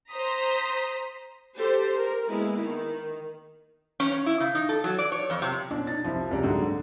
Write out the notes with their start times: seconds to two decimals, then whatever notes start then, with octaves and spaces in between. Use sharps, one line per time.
0.10 C5 A#5 D#6 B6
1.57 G4 A4 C5
1.96 A#4
2.28 G#3 A#3 B3 E4
2.61 D#3
4.00 C#4
4.12 C#4
4.26 E4
4.40 C#3
4.55 D#4
4.69 A4
4.84 F#3
4.98 D5
5.12 C#5
5.30 F2
5.42 C3
5.71 B2 C#4 D4
5.87 D#4 A6
6.04 C2 F3
6.31 C#2 C3 G3 D5 A#5
6.43 G#2 D3 F#4
6.62 D3